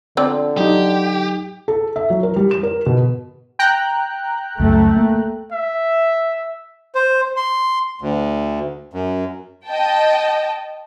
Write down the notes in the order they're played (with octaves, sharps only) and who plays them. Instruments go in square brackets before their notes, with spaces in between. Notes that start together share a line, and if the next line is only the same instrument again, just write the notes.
[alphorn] D3 [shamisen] F3 C4 D5
[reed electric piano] F#3 D#4 [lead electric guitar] G4
[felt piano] A4
E5
F#3
A#4
G3
E7
A#4
B2
[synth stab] G5 A#5 F#6
[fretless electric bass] C#2 F#2 [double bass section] A3
[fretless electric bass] A#3
[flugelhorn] E5
[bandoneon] C5
C6
D2
F#2
[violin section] D#5 G5 A5